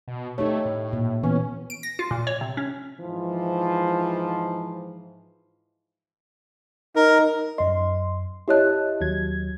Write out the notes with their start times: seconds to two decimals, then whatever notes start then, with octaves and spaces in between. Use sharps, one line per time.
0.08 B2
0.38 A3 D#4 G4 C#5
0.65 A2
0.93 A#2
1.24 E3 B3 C#4
1.70 D7
1.83 A#6
1.99 F4
2.11 A#2
2.27 C#5
2.41 C3
2.57 C#4
3.00 G#2 E3 F3
6.96 D#4 A#4
7.58 F#2 D#5 C6
8.48 E4 G4 C#5 D#5 A5 F#6
9.01 D#2 F#3 G#6